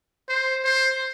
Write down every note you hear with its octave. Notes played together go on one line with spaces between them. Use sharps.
C5
C5